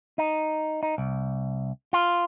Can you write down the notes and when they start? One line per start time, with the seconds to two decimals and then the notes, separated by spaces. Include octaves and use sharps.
0.18 D#4
0.83 D#4
0.98 C2
1.93 F4